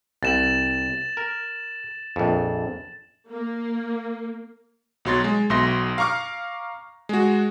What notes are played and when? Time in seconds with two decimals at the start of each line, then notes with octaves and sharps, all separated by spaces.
0.23 C2 A6 E7 F#7
1.17 A#4
2.16 A#1 F2
3.28 A#3
5.05 B1 F#3 C6 A6
5.24 G#3
5.50 B1 B2 E5 C6 A#6
5.98 F5 A#5 C#6 D6 F6
7.09 G#3 F#4